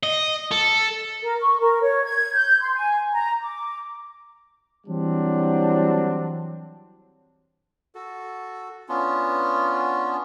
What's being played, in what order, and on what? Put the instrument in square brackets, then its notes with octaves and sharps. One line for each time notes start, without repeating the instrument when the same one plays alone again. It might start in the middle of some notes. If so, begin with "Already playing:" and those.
[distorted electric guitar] D#5
A4
[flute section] A#4
C#6
A#4
C#5
G#6
G6
C6
G#5
A#5
D6
[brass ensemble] E3 F#3 G3 C4 D4
[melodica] F#4 A4
B3 C#4 D4 F4